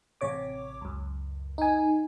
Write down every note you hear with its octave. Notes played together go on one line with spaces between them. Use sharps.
A1 C3 C#5 D6
C#2 F#2
D#4 G#5